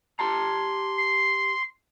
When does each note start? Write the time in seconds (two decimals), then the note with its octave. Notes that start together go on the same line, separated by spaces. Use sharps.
0.19 G4 A5 A#5 C6
0.98 C7